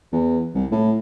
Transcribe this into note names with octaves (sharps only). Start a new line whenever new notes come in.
E2
C2
A2